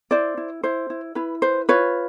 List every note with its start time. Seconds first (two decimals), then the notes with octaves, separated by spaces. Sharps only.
0.11 E4 C5 D5
0.37 E4
0.63 E4 C5
0.90 E4
1.15 E4 B4
1.42 B4 C5
1.69 F4 B4 C#5